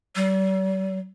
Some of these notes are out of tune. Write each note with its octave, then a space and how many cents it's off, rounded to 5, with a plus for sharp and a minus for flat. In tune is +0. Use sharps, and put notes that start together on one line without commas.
G3 -45